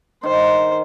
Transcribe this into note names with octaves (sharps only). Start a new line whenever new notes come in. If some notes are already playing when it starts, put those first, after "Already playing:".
D#3 D#4 C5